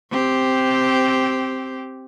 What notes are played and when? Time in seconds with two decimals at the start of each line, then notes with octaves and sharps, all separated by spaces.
0.11 C4 G4